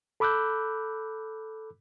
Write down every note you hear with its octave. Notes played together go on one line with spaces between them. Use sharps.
A4 B5 D6 E6 F#6 G6